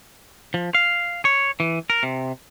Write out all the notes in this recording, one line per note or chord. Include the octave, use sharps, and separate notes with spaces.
F3
F5
C#5
E3
A#4
C3